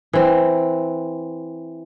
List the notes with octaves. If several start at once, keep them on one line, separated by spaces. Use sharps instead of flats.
E3 C4